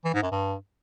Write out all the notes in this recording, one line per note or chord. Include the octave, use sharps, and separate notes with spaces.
E3
G#2
F#2
G2